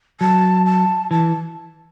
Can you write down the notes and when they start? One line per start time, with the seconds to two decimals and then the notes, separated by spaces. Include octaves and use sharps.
0.21 F#3 A5
0.66 A5
1.11 E3 A5